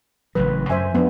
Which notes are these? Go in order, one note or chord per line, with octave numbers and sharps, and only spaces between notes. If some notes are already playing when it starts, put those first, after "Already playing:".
A1 C#3 F#3 B4
F#2 C5 E5 G#5
F2 F3 B3 D4